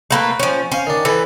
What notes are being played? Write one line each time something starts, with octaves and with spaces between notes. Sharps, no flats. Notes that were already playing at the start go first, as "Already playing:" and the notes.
A3 A#3 B4
F3 C#4
C#4 C5 F5
D#3 D4
E3 A4 B4